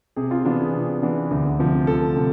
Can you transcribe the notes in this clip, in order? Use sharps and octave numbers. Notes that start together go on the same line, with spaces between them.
C3 G#4
F4
E3 B3 D4 F4
G#4
C3
E3 B3 D4
D2
C3 F3
D2 A4
C3